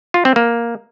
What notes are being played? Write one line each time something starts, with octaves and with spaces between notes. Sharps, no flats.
F4
C4
A#3